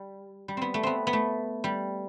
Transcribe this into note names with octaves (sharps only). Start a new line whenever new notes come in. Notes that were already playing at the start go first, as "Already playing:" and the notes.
Already playing: G3
G3
B3 C4
A3
B3 C4
B3
A3
G3